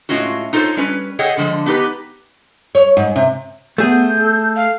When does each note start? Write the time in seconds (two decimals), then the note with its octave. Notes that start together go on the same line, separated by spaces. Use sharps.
0.09 A2 G#3 C#4 F4 F#4
0.53 D#4 F4 A4 A#4 C5 C#5
0.77 G3 C#4 B4
1.19 G#4 A4 C#5 D#5 F#5 G5
1.37 D3 F3 G#3
1.66 B3 D#4 G4 A4 B4
2.75 C#5
2.97 G#2
3.16 C3
3.78 A3 B3 G#4 G6
4.19 A4
4.56 F5